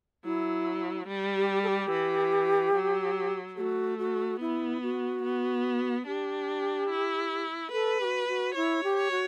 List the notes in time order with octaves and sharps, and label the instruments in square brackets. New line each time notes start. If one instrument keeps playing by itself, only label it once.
[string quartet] F#3 [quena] E4
[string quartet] G3
[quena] G4
A4
G4
[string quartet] E3
F#3
[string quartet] A3 [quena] F#4 G4
[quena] F#4
[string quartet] B3 [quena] E4
[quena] F#4
[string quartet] B3
[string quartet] D4 [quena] G4
[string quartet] E4
[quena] A4 [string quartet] B4
[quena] G4
F#4
F#4
[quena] E4 [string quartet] C#5
[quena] G4
[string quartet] C#5
[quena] F#4